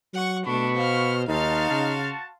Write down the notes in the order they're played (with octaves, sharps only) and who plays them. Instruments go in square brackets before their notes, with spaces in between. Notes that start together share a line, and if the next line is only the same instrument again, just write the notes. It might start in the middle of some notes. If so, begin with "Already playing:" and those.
[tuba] F#3 [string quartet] F#5 C#6
[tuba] B2 [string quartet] A3 D4 [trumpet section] B5 C#6
[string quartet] C5 F6 [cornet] F5
[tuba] D#2 [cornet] D#4 [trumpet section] F#4 A5 [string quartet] F5 C6 F6
[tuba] C#3